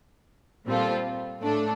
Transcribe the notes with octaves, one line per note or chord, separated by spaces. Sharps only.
A#2 G3 C4 F4 A4
A2 A3 D4 A4